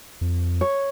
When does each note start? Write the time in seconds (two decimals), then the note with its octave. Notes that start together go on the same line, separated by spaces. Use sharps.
0.21 F2
0.61 C#5